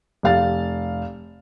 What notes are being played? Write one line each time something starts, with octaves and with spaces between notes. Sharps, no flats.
F1 F5 A6